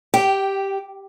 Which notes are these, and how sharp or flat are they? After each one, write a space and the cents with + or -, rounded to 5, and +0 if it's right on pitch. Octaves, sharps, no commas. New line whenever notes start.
G4 +0 G5 -15